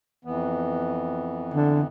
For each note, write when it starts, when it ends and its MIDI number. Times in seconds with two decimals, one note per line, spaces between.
0.25 1.87 41
0.25 1.87 52
0.25 1.87 59
1.54 1.82 50